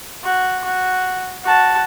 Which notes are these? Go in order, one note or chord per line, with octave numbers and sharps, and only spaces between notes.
F#4
F#4
F#4 A5